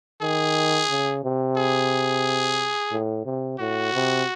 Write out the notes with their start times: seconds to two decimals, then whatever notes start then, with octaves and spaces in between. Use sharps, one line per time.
0.22 D#3 G#4
0.90 C#3
1.24 C3
1.57 G#4
2.92 A2
3.26 C3
3.59 A2 F#4
3.93 C3